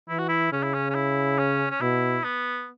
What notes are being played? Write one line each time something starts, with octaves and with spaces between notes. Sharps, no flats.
E3 E4
F#4
E4
C#3 C#4
E4
C#4
C#4
E4
C#4
C#4
B2 E4
B3